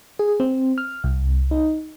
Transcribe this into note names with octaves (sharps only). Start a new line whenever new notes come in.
G#4
C4
F6
C2
D#4